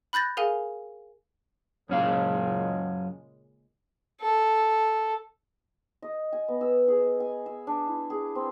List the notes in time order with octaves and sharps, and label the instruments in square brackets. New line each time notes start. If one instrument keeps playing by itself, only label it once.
[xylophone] B5 F#6 G6 A6 A#6
G#4 A#4 F5 G#5
[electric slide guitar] F#2 C#4 F5 [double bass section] A#2 C#3 G#3
[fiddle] A4
[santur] D#5
G#5
B3
E6
G#4
D#5
G#5
E6
D4
E4
G#4
C4